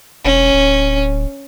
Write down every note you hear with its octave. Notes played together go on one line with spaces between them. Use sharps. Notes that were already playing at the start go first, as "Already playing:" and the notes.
E1 C#4
D1